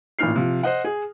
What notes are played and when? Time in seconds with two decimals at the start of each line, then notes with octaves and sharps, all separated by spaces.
0.19 A1 A#2 D#4 F6 C7
0.35 C3 F3
0.63 C5 D#5 F#5
0.84 G#4